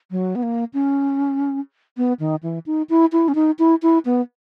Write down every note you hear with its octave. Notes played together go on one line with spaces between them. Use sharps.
F#3
B3
A#3
C#4
B3
D#3
E3
D#4
E4
E4
C#4
D#4
E4
E4
B3